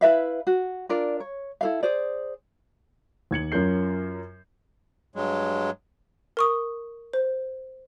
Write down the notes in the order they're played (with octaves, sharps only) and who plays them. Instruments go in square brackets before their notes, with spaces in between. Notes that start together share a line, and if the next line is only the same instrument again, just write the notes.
[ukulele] E4 B4 E5 F5
F#4
D4 F4 A#4 D5
C#5
E4 A4 F5
G#4 C5 D5
[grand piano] D#2 G#6 C#7 F#7
F#2 C#4 F4 A#4 G6 C7
[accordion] G2 F#3 G#3
[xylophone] A#4 C#6 D#6
C5